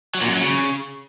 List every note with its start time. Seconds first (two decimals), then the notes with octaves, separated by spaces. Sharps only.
0.15 F#3
0.21 A#2
0.28 F#2
0.34 F#3
0.41 C#3